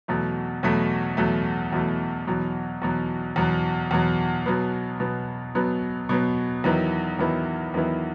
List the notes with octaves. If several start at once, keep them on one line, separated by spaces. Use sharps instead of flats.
E2 B2 F#3 A3
E2 B2 F#3 A3
E2 B2 F#3 A3
E2 B2 F#3 A3
E2 B2 F#3
E2 B2 F#3
E2 B2 F#3
E2 B2 F#3
B2 F#3 B3
B2 F#3 B3
B2 F#3 B3
B2 F#3 B3
E2 D#3 F#3 B3 E4
E2 D#3 F#3 B3 E4
E2 D#3 F#3 B3 E4